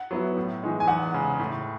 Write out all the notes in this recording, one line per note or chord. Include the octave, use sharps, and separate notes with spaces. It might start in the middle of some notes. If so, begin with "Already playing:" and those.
Already playing: F#5
F#3 B3 E4
A2
E3 G#3 D#4
G#5
E2 F#5
C#3 G#3
A2